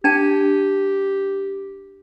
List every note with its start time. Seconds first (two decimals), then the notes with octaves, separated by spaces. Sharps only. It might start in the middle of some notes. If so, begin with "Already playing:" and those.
0.04 D4 G4 G5 A5